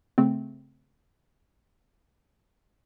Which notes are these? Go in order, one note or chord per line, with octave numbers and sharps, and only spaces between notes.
C#3 A3 C4